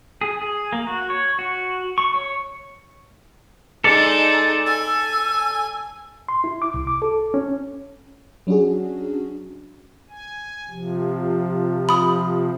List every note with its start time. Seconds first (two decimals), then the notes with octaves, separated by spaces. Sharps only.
0.21 G#4
0.42 G#4
0.73 A#3
0.87 F#4
1.10 C#5
1.39 F#4
1.98 C#6
2.14 C#5
3.84 G#3 D#4 A4 D5
4.66 G#5 E6
6.29 C6
6.44 E4
6.62 D6
6.74 C2
6.87 D6
7.02 A4
7.34 C#4
8.47 F#3 C#4 D4 F#4 G#4
10.09 G#5
10.69 C3 F3
11.89 B5 D#6